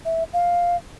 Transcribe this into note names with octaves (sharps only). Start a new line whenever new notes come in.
E5
F5